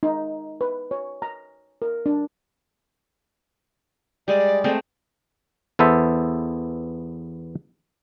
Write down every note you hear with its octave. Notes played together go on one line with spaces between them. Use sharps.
D#4
B4
C#5
A#5
A#4
D4
G3 G#3 D5
G#3 A3 C4
E2 B3 A4 C5 E5